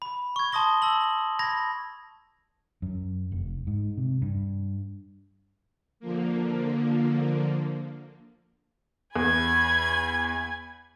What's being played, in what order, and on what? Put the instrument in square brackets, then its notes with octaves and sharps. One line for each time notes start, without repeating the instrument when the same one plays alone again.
[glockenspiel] B5
C#6 G#6
A5 C6 D#6 A#6 G7
A5 E6 A#6 F#7
B5 G#6 A#6
[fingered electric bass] F#2
F1
G#2
C3
G2
[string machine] D3 F3 A#3
[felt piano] E2 [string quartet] G#5 B5 G#6